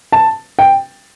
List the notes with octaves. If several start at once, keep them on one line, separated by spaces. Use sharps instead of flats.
A5
G5